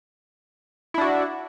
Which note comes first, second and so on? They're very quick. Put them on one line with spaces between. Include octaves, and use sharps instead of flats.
E4 D4 F#4